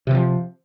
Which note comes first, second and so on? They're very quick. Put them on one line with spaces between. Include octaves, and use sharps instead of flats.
C3 E3 F3